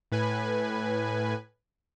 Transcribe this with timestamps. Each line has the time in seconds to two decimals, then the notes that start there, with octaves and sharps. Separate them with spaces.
0.12 A2 B4 G#5